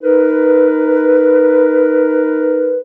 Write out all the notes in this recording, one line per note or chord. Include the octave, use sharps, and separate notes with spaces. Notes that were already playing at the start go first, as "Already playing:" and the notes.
D#4 A#4 B4